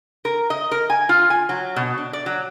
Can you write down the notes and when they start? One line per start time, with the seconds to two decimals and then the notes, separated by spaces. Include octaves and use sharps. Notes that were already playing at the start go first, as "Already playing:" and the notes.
0.25 A#4
0.50 D#5
0.71 A#4
0.90 G#5
1.09 F4
1.30 G#5
1.49 F#3
1.76 B2
1.98 D4
2.13 D5
2.26 F#3